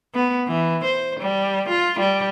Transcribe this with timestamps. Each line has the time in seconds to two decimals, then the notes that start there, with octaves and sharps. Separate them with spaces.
0.14 B3
0.47 E3
0.84 C5
1.20 G3
1.69 F4
1.99 G3